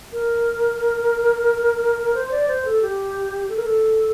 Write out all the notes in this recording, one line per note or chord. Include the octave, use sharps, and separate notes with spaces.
A#4
C5
D5
C5
A4
G4
A4
A#4
A4